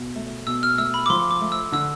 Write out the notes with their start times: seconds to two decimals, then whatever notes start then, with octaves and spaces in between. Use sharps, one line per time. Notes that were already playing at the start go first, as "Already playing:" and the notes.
Already playing: B2
0.16 A3
0.47 B2 E6
0.63 F6
0.78 A3 E6
0.94 B5
1.06 D6
1.10 F3 C6
1.31 D6
1.41 A3
1.52 E6
1.72 D3 E6